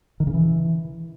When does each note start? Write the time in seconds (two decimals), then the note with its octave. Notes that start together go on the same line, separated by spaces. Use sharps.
0.20 D#3
0.27 C#3
0.34 E3